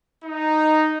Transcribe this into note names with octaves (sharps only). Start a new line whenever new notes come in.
D#4